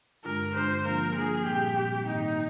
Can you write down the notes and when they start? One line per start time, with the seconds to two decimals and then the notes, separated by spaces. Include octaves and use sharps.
0.24 G2 D3 G#3 D4 F4 A#4
0.54 G2 D3 G#3 D4 F4 C5
0.85 F3 A#3 D4 F4 A#4
1.15 F3 A#3 D4 F4 G#4
1.46 A#2 G3 C4 G4
1.76 A#2 G3 C4
2.06 G#2 D#3 A#3 D#4